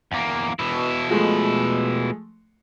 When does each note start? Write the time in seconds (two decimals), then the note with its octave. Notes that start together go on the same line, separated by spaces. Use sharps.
0.12 E2 A#3
0.59 B2 E4
1.09 F3 G#3 A3